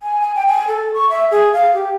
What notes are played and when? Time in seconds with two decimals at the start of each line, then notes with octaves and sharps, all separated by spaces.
0.03 G#5
0.21 G#5
0.36 G5
0.47 G#5
0.68 A4
0.94 C#6
1.10 E5
1.31 G#4
1.53 F5
1.74 G4